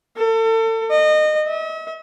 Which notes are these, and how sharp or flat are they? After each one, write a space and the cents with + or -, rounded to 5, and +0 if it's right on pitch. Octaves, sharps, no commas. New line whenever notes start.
A4 +35
D#5 -25
E5 -45